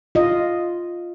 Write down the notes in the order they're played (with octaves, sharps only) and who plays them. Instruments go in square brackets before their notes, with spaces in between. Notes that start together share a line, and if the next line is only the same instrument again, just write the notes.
[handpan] F4 D#5